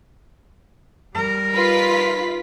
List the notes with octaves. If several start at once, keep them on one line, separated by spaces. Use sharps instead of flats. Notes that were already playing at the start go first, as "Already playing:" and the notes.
G3 A#4
D#4 F4 B4 B6